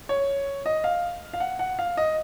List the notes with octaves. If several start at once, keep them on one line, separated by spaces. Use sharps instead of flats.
C#5
D#5
F5
F5
F#5
F#5
F5
D#5